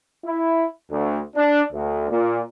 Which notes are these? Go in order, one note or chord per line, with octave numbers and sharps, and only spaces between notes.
E4
D2
D4
D2
A#2